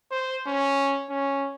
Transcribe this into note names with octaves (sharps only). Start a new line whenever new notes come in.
C5
C#4
C#4